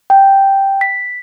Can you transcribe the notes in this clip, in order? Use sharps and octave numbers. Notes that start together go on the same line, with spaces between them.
G5
B6